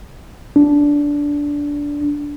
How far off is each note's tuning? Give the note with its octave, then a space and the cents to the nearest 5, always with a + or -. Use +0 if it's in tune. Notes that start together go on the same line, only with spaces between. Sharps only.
D4 -15